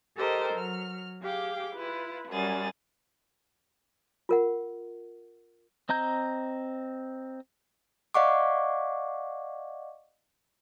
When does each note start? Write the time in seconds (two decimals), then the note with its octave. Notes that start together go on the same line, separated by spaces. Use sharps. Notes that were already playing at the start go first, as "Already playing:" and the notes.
0.18 G4 A4 A#4 C5 D#5
0.54 F#3 F6
1.22 G4 G#4 F5 G5 D6
1.74 E4 F4 B4
2.29 F#2 G3 G#4 A6
4.29 F4 A#4 F#5
5.89 C4 D#5 A#5 G6
8.14 D5 D#5 F5 F#5 C#6 D6